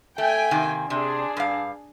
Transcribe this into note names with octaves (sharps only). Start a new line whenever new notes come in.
A3 G5 G#5
C3 D#3 A#3
C3 D4 G#4
G2 F5